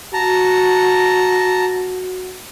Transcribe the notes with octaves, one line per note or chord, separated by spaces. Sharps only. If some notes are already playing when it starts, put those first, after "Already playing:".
F#4 A5 A#5